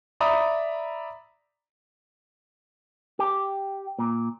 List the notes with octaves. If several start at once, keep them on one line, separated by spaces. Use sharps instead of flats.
D5 E5 A#5 B5 D#6
G4
A#2